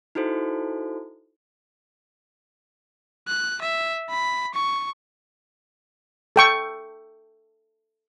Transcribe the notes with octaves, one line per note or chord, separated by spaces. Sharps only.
D#4 E4 F#4 A4 C5
F#6
E5
B5
C#6
A4 G5 C#6